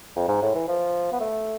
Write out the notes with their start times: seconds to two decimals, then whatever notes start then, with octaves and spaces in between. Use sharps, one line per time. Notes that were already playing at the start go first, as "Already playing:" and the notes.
0.16 F2
0.28 G#2
0.42 A2
0.55 E3
0.68 F3
1.12 B3
1.20 A3